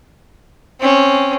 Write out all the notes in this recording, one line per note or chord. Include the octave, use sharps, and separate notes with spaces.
C4 C#4